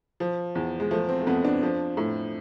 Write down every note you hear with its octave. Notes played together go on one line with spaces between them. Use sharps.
F3
E2
G#3
F3 A3
C4
A3
F2 B3
D4
F3
A2